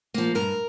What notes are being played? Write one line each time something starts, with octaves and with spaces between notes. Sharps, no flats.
F3 A#3
G2 A#4